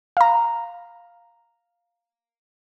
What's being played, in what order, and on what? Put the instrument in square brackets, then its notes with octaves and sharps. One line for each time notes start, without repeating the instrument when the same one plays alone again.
[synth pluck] F5 A#5